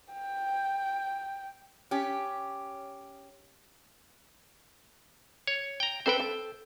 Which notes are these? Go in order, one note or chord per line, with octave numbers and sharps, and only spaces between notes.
G5
C#4 G4
C#5
G5 A#5
C4 A4 B4 C5 G5
A4